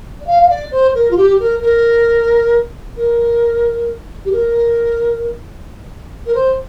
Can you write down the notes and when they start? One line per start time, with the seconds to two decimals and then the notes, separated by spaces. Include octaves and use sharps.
0.20 D5
0.26 F5
0.42 F5
0.49 D5
0.71 C5
0.94 A#4
1.10 F4
1.17 G4
1.39 A#4
1.61 A#4
2.96 A#4
4.25 G4
4.32 A#4
6.26 A#4
6.34 C5